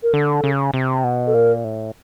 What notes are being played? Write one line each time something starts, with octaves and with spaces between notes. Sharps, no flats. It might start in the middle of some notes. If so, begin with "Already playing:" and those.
A#4
D3 A4
C#3
C3
B2
A4
A#2 A#4
A2